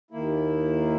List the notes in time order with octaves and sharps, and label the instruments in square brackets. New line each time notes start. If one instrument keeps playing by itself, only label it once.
[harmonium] D#2 D#3 A#3 E4